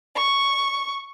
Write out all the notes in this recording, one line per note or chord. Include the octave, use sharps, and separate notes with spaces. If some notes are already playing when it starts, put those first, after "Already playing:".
C#6